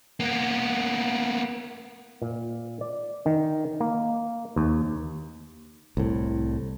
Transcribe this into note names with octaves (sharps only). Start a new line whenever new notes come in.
A#3 B3
A#2
D5
D#3
A#3
D#2
C2 A2